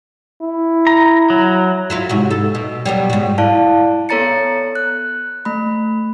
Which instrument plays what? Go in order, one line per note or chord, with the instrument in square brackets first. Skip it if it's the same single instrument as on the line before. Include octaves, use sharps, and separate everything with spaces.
[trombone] E4
[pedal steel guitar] A#5
F#3
[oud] F#3 E4 F4
G#2 C3 F#4
A4
B2
B2 F#3 G3
G#2 F#4
[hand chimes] E4 D5 F5 A5
B3 A4 C#5 A#5 A6 C#7
F#6
A3 B5